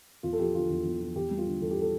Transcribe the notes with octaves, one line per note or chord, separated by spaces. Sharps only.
E2 F4
A4
F3 G4
D3 F4
E2
E2
F3
E2 G4
G3
F4
D3
E2 A4
G4
A4